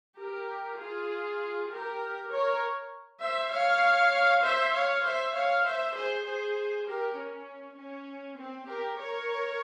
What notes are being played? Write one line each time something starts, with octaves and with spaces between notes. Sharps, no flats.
G4 A#4
F4 G#4
G4 A#4
A#4 C#5
C5 E5
C#5 F5
C5 E5
C#5 F5
C5 E5
C#5 F5
C5 E5
G#4 C5
G#4 C5
G4 A#4
C#4
C#4
C4
G4 A#4
A#4 C#5